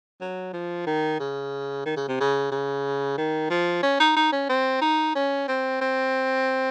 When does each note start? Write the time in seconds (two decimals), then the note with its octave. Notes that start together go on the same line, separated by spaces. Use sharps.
0.21 F#3
0.53 F3
0.87 D#3
1.20 C#3
1.85 D#3
1.97 C#3
2.08 C3
2.20 C#3
2.52 C#3
3.18 D#3
3.50 F3
3.83 C#4
4.00 D#4
4.16 D#4
4.32 C#4
4.49 C4
4.82 D#4
5.15 C#4
5.48 C4
5.81 C4